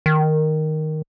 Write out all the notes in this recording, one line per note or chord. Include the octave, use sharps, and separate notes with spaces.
D#3